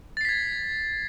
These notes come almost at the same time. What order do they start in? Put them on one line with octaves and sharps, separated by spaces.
A6 C7 B6 G#6